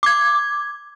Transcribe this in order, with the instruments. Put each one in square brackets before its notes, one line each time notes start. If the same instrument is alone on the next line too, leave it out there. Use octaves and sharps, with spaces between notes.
[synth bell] D6 G#6